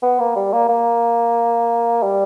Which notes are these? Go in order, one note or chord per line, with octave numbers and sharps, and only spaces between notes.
B3
A#3
G3
A#3
A#3
G3